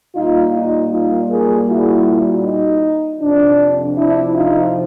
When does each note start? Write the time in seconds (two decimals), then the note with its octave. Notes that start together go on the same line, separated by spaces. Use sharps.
0.15 A#2 G3 A#3 D#4 F4
0.53 D#4
0.91 D#4 F4
1.29 G#4 A#4
1.68 E4 F#4
2.44 D#4
3.21 F2 C3 F3 D4
3.96 D4 E4
4.35 D#4 F4